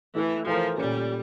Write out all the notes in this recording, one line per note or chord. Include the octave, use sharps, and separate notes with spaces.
E3 A3 E4 A4
E3 F3 A3 E4 A#4
A#2 G3 A3 C#4